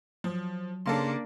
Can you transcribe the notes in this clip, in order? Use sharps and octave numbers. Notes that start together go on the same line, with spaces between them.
F3 F#3
C#3 A#3 D4 A4 F5 C6